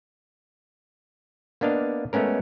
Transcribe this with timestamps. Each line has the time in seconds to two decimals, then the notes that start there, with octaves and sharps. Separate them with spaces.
1.61 A#3 B3 D4 D#5 F5
2.13 G#3 A3 B3 C#4 A#4